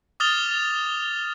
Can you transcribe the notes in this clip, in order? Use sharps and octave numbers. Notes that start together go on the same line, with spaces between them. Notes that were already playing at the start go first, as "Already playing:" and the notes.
D6 D#6 F6 A6 F7 G7